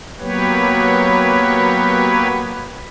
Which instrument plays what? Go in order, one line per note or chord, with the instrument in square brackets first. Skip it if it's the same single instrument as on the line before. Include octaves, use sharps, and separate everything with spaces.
[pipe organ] F#3 A#3 B3 G4 B4 C#5